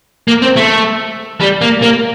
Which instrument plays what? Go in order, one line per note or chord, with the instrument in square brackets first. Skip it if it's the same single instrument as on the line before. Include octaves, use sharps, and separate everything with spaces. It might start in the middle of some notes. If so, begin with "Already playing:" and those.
[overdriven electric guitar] A#3
C4
A3
G3
A#3
A#3